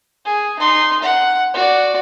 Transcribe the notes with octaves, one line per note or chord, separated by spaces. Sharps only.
G#4
D#4 C6
F#5
F#4 D5